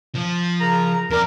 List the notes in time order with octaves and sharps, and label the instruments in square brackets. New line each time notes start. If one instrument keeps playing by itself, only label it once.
[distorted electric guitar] F3
[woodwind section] C#3 A#4 A#5
[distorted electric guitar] F2 D5 [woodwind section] A#4